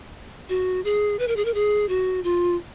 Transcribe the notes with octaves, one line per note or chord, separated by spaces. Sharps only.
F#4
G#4
B4
A#4
G#4
A#4
G#4
F#4
F4